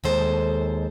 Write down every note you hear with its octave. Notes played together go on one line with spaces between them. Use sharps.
D#2 B2 G#3 A4 C5 D#5